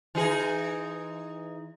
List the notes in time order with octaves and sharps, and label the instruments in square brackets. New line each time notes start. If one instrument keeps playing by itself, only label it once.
[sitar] E3 D#4 G#4